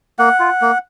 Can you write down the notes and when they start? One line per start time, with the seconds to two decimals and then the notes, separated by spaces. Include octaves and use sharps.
0.19 A#3 F#5
0.40 F4
0.61 A#3